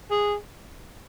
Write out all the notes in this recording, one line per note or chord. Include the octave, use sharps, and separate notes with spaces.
G#4